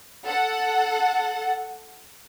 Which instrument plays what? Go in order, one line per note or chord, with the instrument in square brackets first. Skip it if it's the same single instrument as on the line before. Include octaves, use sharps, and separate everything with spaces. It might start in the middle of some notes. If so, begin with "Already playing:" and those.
[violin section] A4 F#5